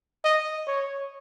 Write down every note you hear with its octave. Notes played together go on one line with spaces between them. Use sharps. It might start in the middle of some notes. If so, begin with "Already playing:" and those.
D#5
C#5